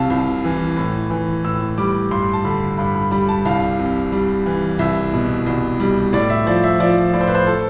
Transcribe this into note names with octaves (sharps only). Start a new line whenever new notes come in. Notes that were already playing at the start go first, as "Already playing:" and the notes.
Already playing: C2 C3 F5 A5
C2
E3
A2
E3
A2 E6
G3 D6
G2 C6
A5
D3 B5
G2 B5
B5
G3 B5
A5
C2 F5
C3
G3
E3
C2 E5
B2
C2
G3
A2 D5
E5
F3 D5
E5
F3 D5
A2 D5
C5
B4
C5
A4